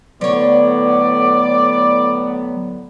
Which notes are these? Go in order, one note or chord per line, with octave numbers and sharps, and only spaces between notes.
A2 D3 F#3 B3 C#5 D5